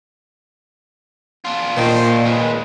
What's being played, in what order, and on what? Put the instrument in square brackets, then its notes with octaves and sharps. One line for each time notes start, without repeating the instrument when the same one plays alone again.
[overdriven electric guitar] D4 F4
[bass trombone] A#2 [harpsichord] D#3 [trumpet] C5
[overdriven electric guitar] D#2 G#3 [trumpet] B4